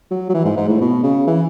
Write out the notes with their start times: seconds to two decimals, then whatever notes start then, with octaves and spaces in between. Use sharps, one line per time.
0.11 F#3
0.29 F#3
0.34 E3
0.45 G#2
0.57 G#2
0.68 A2
0.81 B2
1.03 C#3
1.27 E3